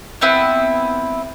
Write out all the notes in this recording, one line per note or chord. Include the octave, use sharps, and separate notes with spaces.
B3 C4 E4